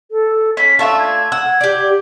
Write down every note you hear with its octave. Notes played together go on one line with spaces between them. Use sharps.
A4
C#4 B5 B6
A3 D4 F4 E5 A5 C#6
G#6
F#5 E6
G4 D5